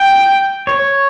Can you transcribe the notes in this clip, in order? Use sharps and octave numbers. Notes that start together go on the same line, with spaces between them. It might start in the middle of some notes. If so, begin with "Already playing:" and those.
Already playing: G5
C#5